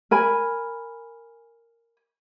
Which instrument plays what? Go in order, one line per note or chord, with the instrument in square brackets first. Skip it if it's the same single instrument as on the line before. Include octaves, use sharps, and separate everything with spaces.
[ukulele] A#4 G#5 B5